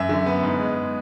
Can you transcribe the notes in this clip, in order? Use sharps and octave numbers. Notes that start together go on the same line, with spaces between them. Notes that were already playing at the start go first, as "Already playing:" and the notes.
Already playing: F#2 E5
D3
B3
G#2
G#3